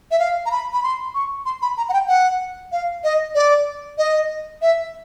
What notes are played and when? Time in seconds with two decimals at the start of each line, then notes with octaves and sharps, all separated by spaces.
0.11 E5
0.19 F5
0.46 A#5
0.51 B5
0.73 B5
0.83 C6
1.15 C#6
1.46 C6
1.62 B5
1.77 A#5
1.89 F#5
1.93 G5
2.08 F#5
2.72 F5
3.04 D#5
3.35 D5
3.98 D#5
4.62 E5